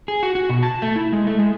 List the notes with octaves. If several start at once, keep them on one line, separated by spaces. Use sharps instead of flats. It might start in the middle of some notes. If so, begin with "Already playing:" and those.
G#4
F#4
F#4
B2
A5
A3
E4
G#3
A3
G#3